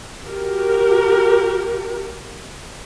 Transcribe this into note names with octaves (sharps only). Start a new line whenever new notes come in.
F#4 G4 A#4